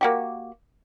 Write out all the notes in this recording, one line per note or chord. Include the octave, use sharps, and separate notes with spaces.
A#3 F#4 G4